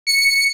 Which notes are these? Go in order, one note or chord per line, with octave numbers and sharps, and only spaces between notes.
C#7